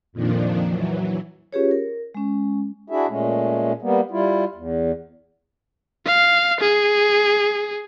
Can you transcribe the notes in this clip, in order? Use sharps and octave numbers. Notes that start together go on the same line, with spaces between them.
F2 A#2 D#3 F3 D4
E3 F#3
C#4 F4 G4 G#4 B4 C#5
A#4
G#3 C#4
D4 E4 F#4 G#4 E5
A#2 G#3 A3 C#4
G3 A#3 B3
G3 E4 F4
E2
F5
G#4